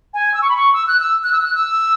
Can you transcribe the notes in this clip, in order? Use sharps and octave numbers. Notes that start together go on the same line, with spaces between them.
G#5
E6
C#6
B5
C#6
E6
F#6
E6
F#6
E6
F#6
E6